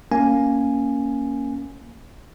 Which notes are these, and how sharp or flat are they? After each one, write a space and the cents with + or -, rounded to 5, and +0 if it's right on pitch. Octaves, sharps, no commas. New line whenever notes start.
A#3 +0 C#4 +0 G#5 +0